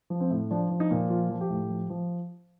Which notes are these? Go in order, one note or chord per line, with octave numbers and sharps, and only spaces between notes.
F3
C4
A2
F3 D4
F3
D#4
A#2
F3 F4
F3
G4
A2
F3
F3